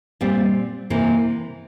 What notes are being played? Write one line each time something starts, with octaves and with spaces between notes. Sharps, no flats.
A#2 G3 C4
C3 E3 A#3